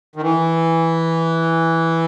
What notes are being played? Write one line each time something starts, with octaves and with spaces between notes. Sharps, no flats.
D#3
E3